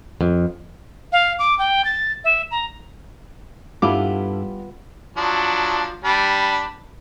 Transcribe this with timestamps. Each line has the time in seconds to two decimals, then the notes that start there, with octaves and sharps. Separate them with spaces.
0.21 F2
1.12 F5
1.39 D6
1.59 G5
1.85 A6
2.24 E5
2.51 A#5
3.82 G2 G3 B3 E4 F4 A4 D6
5.17 F3 F#3 D4
6.04 G3 D4 B5